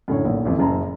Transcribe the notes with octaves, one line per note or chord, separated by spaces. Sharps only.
F#2 A2 D3 C#5
B1 A#2
D#1 A1 F2
F#1 F#2 A5 A#5